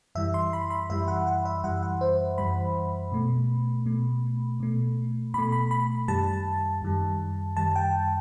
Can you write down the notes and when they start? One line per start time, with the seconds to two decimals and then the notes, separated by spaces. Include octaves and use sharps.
0.15 F#2 E3 G3 E5
0.34 C6
0.53 B5
0.70 B5
0.90 F#2 E3 G3 E5
1.08 F#5
1.27 F#5
1.45 E5
1.64 F#2 E3 G3 F#5
1.83 F#5
2.01 C5
2.38 F#2 E3 G3 B5
3.12 B2 A3
3.86 B2 A3
4.60 B2 A3
5.34 B2 A3 B5
5.52 B5
5.71 B5
6.08 F#2 D#3 G3 A5
6.82 F#2 D#3 G3
7.57 F#2 D#3 G3 A5
7.76 G5